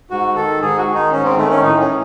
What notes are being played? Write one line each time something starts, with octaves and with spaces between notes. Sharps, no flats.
G#2 F#4
D#3 A4
G#2 G#4
F#4
D#3
D#4
G#2 C#4
C4
D#3 A3
C#4
A2 D#4
C#4
E3